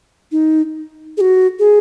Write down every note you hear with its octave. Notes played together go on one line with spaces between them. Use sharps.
D#4
G#4
F#4
G#4